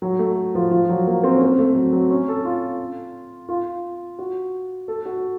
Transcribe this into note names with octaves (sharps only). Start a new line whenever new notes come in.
F#3
A3
F3
F3
F#3
A#3
C4
C#4
C4
A3
F#3
F#3
C#4
A4
F4
F4
F#4
A4
F#4